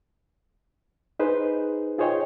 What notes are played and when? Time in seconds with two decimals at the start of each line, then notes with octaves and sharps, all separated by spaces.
1.19 D#4 G#4 B4 C5
1.98 F4 G#4 C5 C#5 D#5 G5